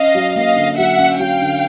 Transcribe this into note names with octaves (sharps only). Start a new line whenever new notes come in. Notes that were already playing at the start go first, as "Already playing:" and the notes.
Already playing: C#4 D#5 F5
F#3
A#3 D#5 F5
D3
F#3 E5 F#5
C#4
F#3 F5 G5
D3